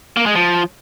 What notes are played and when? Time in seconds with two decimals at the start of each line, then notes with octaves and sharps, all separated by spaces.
0.17 A#3
0.26 G#3
0.35 F3